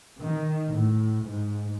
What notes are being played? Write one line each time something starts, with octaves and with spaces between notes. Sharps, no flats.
D#3
A2
G#2